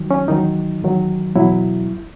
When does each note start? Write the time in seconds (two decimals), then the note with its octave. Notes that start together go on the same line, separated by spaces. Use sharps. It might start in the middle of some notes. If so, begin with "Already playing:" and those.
Already playing: D#3 F#3
0.11 C#4
0.28 E2 D#3 F#3 D#4
0.82 E2 D#3 F#3
1.35 E2 B2 F#3 E4